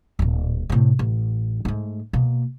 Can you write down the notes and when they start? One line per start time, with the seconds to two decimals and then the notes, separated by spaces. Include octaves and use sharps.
0.19 D1 A#2
0.70 A2 C3
0.99 A1
1.65 G#2 A3
2.13 B2 A#3